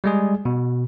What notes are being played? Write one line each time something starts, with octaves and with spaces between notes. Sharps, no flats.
G3 G#3 G#4
B2